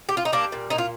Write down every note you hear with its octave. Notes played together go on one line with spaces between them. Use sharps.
G4
F4
D#4
G3 A#3 D4
A#2
A#2 D#4
F4